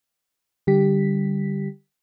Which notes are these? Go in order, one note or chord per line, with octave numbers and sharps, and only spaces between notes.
D3 G3 G4 B6